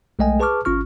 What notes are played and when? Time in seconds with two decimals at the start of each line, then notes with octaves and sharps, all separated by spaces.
0.19 B1 G#3 A3 D#5 G5 G#5
0.40 G#4 B4 A5 C#6 D6 F6
0.65 G1 C#4 F4 C#6 F6